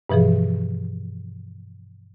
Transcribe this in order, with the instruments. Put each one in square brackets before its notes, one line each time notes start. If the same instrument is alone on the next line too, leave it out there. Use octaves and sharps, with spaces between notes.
[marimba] G2 B2 E3 F3 G#4